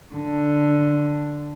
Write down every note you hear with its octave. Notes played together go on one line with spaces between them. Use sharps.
D3